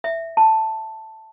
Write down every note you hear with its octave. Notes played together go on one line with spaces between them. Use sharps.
E5
A5